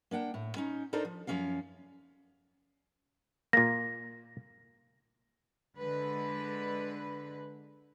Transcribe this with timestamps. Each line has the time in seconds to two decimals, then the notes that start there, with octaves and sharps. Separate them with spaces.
0.11 A#3 D4 F#5 G5
0.34 A2
0.56 C#4 D#4
0.93 D4 D#4 A4 A#4 C5
1.05 F3
1.27 F#2 F3 A3 C#4 D4 F5
3.53 A#2 A#3 A#6
5.79 D3 G#3 B4